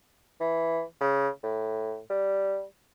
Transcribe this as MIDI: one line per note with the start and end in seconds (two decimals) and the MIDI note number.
0.40 0.82 52
1.00 1.28 49
1.43 1.99 45
2.10 2.64 55